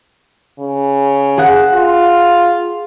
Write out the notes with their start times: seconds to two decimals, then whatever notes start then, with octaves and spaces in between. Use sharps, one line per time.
0.59 C#3
1.38 G#4 F#5
1.74 F4